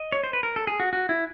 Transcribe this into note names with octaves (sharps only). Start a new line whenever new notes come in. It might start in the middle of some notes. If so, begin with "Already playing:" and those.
Already playing: D#5
C#5
C5
B4
A#4
A4
G#4
F#4
F#4
E4